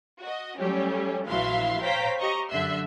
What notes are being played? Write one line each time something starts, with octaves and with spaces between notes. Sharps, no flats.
F#4 D#5
F#3 G3 A3 C#4 G4
A#1 E3 F#3 E5 F5 C6
C5 C#5 F5 G5 A#5 B6
G4 D#5 A#5 C#6
F#2 D3 E5 C6 E6 F#6